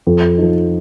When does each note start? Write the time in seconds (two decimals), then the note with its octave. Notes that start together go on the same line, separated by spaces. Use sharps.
0.07 F2
0.38 F3 D#4